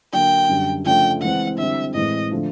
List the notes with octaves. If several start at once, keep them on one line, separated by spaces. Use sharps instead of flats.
D3 F#3 A#3 G5
F#2 D3 G3
C#3 F3 A3 D4 F4 G5
E3 G#3 C4 F#5
D3 G3 C4 E4 E5
A2 E3 G#3 C4 D#5
D3 F3 A3